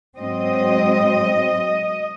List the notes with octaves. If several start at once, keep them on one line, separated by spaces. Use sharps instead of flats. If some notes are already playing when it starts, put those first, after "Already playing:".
G#2 F#3 C4 D#5